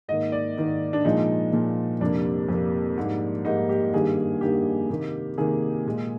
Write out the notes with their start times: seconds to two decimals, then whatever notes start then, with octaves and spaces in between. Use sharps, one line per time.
0.08 G#2 D#3 A#3 D#5
0.32 D5
0.57 G#2 D#3 A#3
0.93 D4
1.05 A#2 F3 G#3 D#4
1.53 A#2 F3 G#3
2.00 F2 C3 G3 A#3 D4
2.48 F2 C3 G3 A#3
2.97 G#2 G3 A#3
3.45 G#2 G3 A#3 D#4
3.69 G4
3.93 G2 D#3 G3 A#3 G#4
4.41 G2 D#3 G3 A#3 G4
4.89 C3 D#3 A#3
5.37 C3 D#3 A#3 G#4
5.86 A#2 G#3